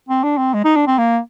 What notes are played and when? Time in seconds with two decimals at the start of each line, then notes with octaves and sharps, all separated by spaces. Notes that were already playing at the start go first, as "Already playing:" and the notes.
0.09 C4
0.24 D4
0.38 C4
0.53 G#3
0.64 D#4
0.76 D4
0.87 C4
0.98 A#3